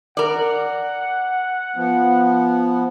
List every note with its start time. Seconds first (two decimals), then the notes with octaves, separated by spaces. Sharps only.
0.17 A#4 D5 F#5
1.76 F3 B3